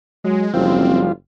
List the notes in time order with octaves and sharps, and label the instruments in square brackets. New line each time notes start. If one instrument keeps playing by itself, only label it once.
[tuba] F#3 [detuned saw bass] G#3
[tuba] F#1 [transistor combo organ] F3 G3 F4 [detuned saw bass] C4